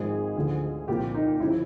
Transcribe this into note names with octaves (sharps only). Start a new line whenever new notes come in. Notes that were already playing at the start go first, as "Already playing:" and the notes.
Already playing: G#1 G#2 F3 G#4
D2 D3 F3
C2 A#2 F3 G4
D#4
G1 C#3 F3 E4